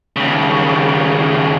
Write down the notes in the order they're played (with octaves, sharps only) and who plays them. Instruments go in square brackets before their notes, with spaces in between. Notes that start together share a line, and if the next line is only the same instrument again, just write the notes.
[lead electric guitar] D#2 C#3